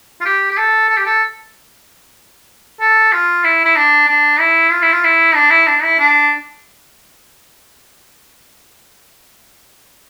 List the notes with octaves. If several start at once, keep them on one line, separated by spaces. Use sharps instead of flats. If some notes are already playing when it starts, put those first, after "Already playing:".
F4
G4
G4
A4
A4
G4
A4
A4
F4
E4
E4
D4
D4
E4
F4
E4
F4
E4
D4
E4
D4
E4
D4